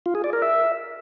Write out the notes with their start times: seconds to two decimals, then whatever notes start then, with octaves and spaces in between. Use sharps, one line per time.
0.06 F4
0.15 G#4
0.24 D5
0.33 A#4
0.42 E5